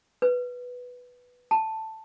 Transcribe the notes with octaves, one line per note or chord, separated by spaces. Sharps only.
B4
A5